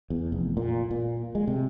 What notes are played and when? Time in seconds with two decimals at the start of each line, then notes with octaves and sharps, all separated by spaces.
0.10 E2
0.32 F1
0.57 A#2
0.91 A#2
1.35 G#3
1.47 C3